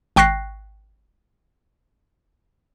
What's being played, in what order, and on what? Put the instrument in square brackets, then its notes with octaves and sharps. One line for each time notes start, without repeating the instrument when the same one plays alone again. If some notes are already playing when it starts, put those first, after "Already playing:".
[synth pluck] G#1 G5 C#6 F#6 A#6 C7